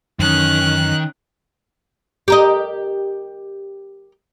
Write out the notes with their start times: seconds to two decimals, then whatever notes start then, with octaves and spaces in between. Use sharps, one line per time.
0.19 F#2 D#3 E3 C#4 F#6
2.28 G4 A#4 D#5